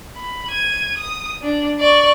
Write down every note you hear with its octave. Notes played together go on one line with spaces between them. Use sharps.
B5
G#6 D#7
D#6
D4
D5 C#6